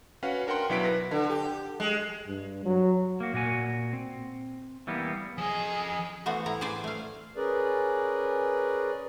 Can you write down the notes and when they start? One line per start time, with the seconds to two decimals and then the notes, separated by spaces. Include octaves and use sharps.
0.23 C#4 F#4 B4 F5 F#5
0.47 D4 A#4 F#5 G5 C6
0.69 B1 F#3 E4 B4 B6 D7
0.85 B4 A#6
1.11 D3
1.30 G4
1.80 G#3
2.28 G2
2.65 F#3
3.20 A#3 F#4
3.33 A#2 F#4 G#5
3.93 C4
4.87 E3 G3 A#3 B3
5.38 F3 G#4 D#5
6.26 E3 A3 B3 F#4 C5
6.46 A2 E4 A#5
6.61 G#4 B4 C5 D5 G#5
6.84 A3 F5
7.37 C#4 G#4 A#4 B4 D5